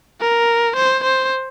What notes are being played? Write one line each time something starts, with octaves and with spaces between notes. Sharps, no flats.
A#4
C5
C5